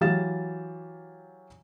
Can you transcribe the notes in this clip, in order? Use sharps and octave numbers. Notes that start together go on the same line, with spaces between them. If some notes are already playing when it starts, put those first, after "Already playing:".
E3 F#3 G4 F5 A6 E7